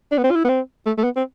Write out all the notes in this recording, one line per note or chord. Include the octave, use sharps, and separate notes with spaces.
D4
B3
C4
F4
E4
B3
C4
A3
A3
B3
C4